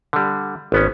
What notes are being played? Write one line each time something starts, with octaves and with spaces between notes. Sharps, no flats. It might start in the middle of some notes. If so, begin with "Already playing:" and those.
D3 G3
G#1 B3 C#4